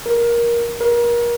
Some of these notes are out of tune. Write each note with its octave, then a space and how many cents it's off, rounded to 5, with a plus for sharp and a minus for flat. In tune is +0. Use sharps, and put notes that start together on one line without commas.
A#4 +15
A#4 +30